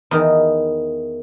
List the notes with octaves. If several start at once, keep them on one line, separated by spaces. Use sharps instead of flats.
E2 D#3